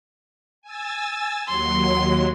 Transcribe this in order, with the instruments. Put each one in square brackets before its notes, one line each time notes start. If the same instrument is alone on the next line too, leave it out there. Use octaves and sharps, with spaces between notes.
[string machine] G#5 E6 A6
[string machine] D#2 F#3 [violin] C6